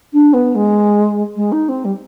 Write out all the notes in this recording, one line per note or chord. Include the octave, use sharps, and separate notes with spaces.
D4
B3
G#3
G#3
D#4
C4
G3